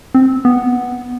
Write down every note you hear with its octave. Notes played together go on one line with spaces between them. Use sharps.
C4
B3